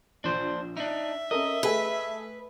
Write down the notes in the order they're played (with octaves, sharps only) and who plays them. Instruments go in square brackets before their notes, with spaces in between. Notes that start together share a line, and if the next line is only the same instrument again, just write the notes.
[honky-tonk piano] A#1 [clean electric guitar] D4 C5
[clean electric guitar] D4 D#4 [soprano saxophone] E5 [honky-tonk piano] D7
[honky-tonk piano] C#4 A4 A#4 [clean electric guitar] D#5
[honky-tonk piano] A3 G#4 A4 [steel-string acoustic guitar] B4